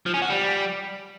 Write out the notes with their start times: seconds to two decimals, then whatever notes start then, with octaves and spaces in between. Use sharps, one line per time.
0.06 F3
0.14 C#4
0.22 F#4
0.30 G3